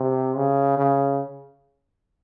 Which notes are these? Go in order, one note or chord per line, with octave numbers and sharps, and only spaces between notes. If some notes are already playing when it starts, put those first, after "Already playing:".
Already playing: C3
C#3
C#3